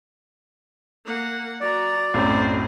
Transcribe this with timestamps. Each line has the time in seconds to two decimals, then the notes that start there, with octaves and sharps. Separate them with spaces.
1.05 A#3 F#5
1.61 F#3 D5 A#5
2.14 B1 F#2 A2 C4 C5